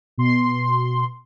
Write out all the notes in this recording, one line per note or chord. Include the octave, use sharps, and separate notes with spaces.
B2 C6